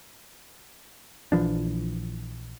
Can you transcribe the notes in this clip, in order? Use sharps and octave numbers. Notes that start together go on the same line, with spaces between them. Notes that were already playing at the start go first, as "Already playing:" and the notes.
A#1 E3 F3 D4